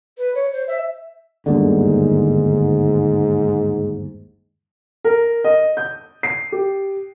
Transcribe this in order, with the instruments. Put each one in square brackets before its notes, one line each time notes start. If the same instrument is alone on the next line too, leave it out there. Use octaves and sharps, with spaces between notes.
[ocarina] B4
C#5
C5
E5
[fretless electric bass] G1 D#2 D3 [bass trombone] G#2
[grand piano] A#4
D#5
G6
C7
G4